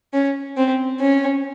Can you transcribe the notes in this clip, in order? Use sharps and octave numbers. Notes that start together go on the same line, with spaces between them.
C#4
C4
C#4